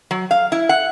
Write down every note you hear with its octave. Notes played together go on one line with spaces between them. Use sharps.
F#3
F5
E4
F#5